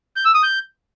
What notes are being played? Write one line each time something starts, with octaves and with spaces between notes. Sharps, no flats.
G6
E6
D#6
G6